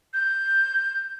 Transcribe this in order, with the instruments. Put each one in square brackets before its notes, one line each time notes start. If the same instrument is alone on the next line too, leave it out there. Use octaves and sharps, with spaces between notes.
[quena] G6